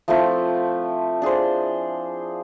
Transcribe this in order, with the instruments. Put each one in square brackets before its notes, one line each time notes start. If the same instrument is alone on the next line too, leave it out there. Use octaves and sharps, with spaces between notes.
[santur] F3 A3 C4 E4
D4 G#4 C5